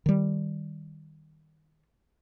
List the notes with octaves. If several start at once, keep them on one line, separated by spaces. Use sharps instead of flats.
D#3 G3